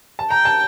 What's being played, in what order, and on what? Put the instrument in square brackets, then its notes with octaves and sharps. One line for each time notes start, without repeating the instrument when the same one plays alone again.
[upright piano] A5
[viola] G5 [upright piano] A#5
[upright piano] A5